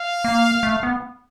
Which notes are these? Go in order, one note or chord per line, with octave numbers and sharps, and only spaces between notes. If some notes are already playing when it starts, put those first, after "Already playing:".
Already playing: F5
A#3
A3
B3